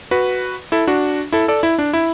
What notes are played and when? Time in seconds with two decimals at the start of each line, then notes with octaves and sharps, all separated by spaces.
0.11 F#4 B4
0.72 E4 A4
0.87 D4 F#4
1.32 E4 A4
1.48 A4 D5
1.63 E4
1.78 D4
1.93 E4